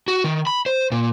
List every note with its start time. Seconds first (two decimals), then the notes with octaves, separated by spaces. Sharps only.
0.08 F#4
0.24 D#3
0.47 B5
0.66 C5
0.92 A#2